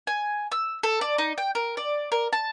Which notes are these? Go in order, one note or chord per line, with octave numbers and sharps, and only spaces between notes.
G#5
E6
A4
D5
D#4
G5
A#4
D5
A#4
A5